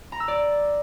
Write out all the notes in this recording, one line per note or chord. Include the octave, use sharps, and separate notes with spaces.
A#5
E6
D5